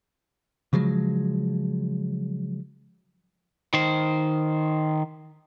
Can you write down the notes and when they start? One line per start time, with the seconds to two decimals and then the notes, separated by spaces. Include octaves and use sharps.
0.73 C#3 F3 F#3 G#3
3.73 D#3 C5